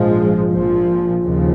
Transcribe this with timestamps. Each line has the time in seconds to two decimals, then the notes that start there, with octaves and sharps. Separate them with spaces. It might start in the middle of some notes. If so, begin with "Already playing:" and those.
Already playing: A#1 G#2 F3 G#3
0.51 A#1 A#2 F3
1.24 D#2 C#3 F3